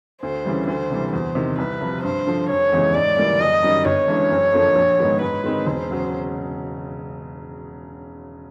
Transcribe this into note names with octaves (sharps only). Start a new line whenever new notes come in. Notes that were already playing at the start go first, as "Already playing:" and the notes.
D2 C5
C#3 E3 G3
D2 C5
C3 E3 G3
E2 C5
C3 D#3
C2 B4
C3 F3
G2 C5
D3 F3
F1 C#5
E2 C#3 E3 G#3
G#2 D5
E3 G3 A#3
F#1 D#5
F#2 D#3 G3
G1 C#5
G2 E3 G#3 C#4
F#1
F2 D3 F3 A#3
A#1
G#2 D#3 G#3 B3
G#2 B4
D#3 G#3 C4 D#4
E1 C5
C#3 F#3